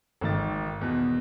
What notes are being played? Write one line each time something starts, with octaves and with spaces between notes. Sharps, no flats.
G#1 D#3 A6
E2 B2